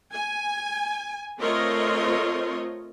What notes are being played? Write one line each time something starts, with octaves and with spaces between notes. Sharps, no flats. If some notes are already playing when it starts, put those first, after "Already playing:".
G#5
A3 C4 F4 A#4 C#5 D#5